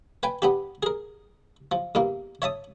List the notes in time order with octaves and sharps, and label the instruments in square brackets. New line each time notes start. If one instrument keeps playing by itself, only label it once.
[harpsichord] B4 G5 G#5
B3 D4 G4
G#4 A#4
F3
E2 G2 A#3
C#5 E5 A5 D#6